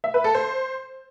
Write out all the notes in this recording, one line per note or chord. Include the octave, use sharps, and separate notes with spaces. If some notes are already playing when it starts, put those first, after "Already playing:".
E5
B4
A4
C5